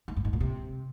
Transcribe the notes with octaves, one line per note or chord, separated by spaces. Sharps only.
G#2
G2
G#2
A#2
C3